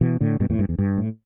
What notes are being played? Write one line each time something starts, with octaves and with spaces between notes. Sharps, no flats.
B2 E3
A2 D3
G2 B2
E2 A2
G2
E2
G2
A2